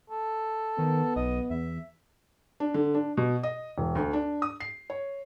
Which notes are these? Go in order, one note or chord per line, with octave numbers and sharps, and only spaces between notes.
A4
D#3 B3
B1 D#5
E2 E5
D4
D3
D4
B2
D#5
E1
D2
D4
D#6
C7
C#5